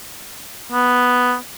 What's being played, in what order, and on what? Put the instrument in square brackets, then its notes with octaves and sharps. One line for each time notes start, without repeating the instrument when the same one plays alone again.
[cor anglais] B3